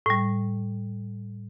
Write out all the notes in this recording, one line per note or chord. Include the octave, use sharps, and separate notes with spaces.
A2 G3